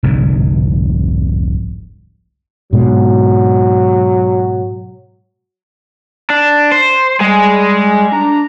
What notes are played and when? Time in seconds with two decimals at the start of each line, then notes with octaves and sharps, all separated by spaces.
0.03 F1 C2 G#2 D3
2.73 G#2 B2 F#3
6.30 D4
6.72 C5
7.20 G3 G#3 G#4
8.11 D4 A#5